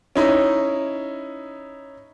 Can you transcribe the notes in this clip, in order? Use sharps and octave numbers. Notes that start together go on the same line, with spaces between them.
C#4 D#4 E4